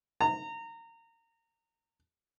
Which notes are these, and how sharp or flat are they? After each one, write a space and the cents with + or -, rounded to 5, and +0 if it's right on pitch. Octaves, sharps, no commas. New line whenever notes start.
A#5 -25